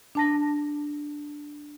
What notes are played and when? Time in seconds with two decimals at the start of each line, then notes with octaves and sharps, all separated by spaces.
0.15 D4 A5 A#6